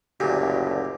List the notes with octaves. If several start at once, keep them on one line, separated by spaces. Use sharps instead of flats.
F#1 D2 A#2 G4